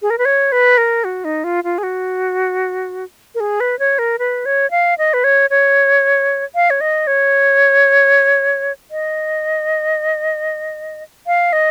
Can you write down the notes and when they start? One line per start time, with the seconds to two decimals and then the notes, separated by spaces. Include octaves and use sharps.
0.02 G#4
0.10 A#4
0.18 B4
0.25 C#5
0.52 B4
0.78 A#4
1.04 F#4
1.25 D#4
1.44 F4
1.64 F4
1.78 G#4
1.83 F#4
3.35 A#4
3.40 G#4
3.60 B4
3.79 C#5
3.99 A#4
4.19 B4
4.46 C#5
4.71 F5
4.98 D#5
5.14 B4
5.24 C#5
5.50 C#5
6.55 F5
6.70 C#5
6.81 D#5
7.07 C#5
8.91 D#5
11.27 F5
11.53 D#5